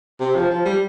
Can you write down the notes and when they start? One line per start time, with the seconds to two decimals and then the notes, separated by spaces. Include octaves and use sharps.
0.20 C3
0.35 F3
0.51 F3
0.66 G3